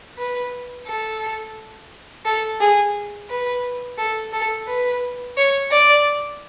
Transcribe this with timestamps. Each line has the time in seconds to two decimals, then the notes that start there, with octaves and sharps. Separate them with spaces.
0.18 B4
0.87 A4
2.25 A4
2.61 G#4
3.29 B4
3.98 A4
4.33 A4
4.68 B4
5.37 C#5
5.72 D5